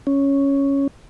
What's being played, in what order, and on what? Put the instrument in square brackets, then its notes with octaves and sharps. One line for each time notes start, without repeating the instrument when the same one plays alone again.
[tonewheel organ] C#4